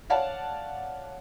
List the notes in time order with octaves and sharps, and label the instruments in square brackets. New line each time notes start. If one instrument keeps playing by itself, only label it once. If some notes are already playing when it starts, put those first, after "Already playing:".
[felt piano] C#5 D5 F5 F#5 A5